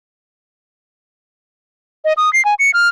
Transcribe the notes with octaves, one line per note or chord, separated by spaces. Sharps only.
D#5
D#6
C7
G#5
C#7
F6